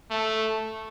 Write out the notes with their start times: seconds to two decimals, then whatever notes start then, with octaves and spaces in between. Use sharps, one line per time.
0.11 A3